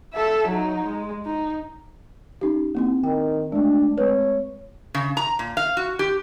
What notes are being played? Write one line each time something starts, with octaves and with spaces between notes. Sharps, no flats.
A4 E5
F#3 D#4
G#3
D#4
C#4 D#4 G4
A#3 C4 E4
D#3 G5
G#3 A3 D4
G#3 C4 B4 C#5
C#3
A#5
A#2
F5
F#4
G4